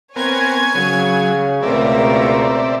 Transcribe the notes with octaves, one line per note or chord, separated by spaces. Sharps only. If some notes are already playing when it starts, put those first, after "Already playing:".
B3 C4 A#4 C#5 G#5 G#6
C#3 F#3
C#2 B2 A3 C4 A#4 D5 E5